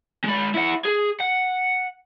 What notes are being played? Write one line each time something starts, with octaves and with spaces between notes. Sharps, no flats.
G#3 B5
E4 F#5
G#4
F#5